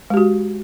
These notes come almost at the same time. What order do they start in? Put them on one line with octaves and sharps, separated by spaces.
G#3 G4 F#4